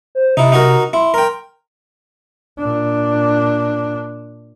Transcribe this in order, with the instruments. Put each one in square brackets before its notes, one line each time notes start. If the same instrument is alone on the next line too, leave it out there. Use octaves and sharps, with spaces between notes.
[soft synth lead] C5
[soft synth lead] C3 [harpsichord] D#4 E4
[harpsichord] D#4 F#4 A#4
[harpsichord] E4 [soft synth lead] C6
[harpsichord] A#4 G5
[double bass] A#2 D4